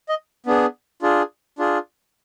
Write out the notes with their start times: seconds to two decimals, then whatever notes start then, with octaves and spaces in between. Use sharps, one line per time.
0.09 D#5
0.46 B3 D4 G#4
1.02 D4 F4 G#4
1.59 D4 F4 G#4